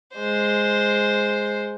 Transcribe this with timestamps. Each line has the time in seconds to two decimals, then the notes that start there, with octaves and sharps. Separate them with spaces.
0.14 G#3 C5